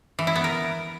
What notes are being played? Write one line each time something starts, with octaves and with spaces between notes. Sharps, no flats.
E3
E4
B3
A#4